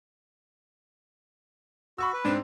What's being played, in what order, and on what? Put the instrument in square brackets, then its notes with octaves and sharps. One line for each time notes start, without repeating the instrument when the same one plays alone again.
[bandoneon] F#4 [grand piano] B5 C#6 E6
[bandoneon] B4
[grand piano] G#2 C4 [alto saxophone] D4